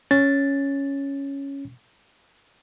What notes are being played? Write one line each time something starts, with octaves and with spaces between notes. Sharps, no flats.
C#4 A6